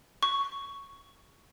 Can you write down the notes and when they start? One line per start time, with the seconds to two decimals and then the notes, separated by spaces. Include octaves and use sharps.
0.23 C#6